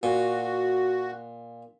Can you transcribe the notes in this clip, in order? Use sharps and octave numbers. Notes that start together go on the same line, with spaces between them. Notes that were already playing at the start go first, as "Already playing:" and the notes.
A#2 F#4